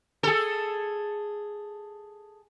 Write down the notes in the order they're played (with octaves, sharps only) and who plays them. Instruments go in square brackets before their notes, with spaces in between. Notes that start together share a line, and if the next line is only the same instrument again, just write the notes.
[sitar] G#4 A4